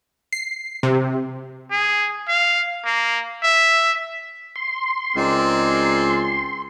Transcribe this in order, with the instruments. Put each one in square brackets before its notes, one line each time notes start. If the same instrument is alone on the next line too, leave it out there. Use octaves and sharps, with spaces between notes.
[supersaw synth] C7
C3
[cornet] G#4
F5
A#3
E5
[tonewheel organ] C6
[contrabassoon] C#2 [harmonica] C4 G#4 [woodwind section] D#4 A#4 D5